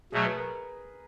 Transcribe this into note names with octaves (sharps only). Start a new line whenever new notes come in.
B2 F#3 A3 G#4
B4
A#4